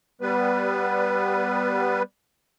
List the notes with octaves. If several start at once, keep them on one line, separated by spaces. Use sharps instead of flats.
G3 B3 B4